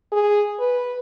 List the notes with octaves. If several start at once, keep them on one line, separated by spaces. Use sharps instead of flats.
G#4
B4